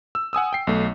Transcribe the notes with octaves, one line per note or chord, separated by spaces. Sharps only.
E6
F#5 G#5 D#6 E6
G5 C7
B1 A3